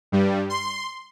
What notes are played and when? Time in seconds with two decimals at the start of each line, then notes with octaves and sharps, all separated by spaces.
0.12 G2 G3
0.50 C6